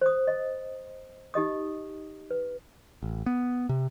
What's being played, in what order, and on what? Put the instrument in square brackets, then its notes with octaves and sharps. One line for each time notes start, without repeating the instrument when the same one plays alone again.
[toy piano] C5 D#6
D#5
D#4 G4 D#5 D#6
B4
[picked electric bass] A1
B3
C3